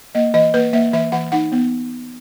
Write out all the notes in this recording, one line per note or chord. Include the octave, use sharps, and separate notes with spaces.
A#3 D#5
E3 D#5
A#3 B4
A#3 E5
E3 E5
E3 F#5
D#4 F#5
B3